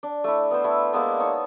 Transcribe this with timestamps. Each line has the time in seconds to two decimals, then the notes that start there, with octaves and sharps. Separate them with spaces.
0.03 D4
0.24 A3 E4
0.51 B3 C5
0.64 A3 E4
0.92 G#3 A#3 B3 D4
1.19 D#4 C#5 A5